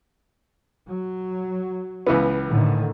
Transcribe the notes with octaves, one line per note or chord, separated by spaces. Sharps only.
F#3
C#2 E3 B3
A2 D3 D#3